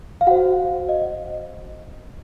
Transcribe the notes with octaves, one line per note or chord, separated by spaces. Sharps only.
F5
F#4 C5 F#5
D#5